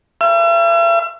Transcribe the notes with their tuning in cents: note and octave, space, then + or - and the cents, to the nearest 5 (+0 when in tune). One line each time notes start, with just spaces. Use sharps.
E5 +45